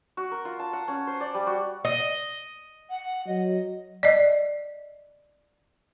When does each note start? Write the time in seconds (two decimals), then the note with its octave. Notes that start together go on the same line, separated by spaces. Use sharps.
0.17 F#4
0.31 A#4
0.45 F4
0.59 A5
0.73 F#5
0.88 C#4
1.07 C5
1.20 D5
1.34 G3
1.47 F#4
1.85 D#5
2.90 F#5
3.27 F#3 D#5
4.03 D5 D#5